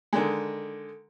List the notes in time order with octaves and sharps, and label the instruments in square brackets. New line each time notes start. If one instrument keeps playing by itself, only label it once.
[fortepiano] D3 D#3 G#3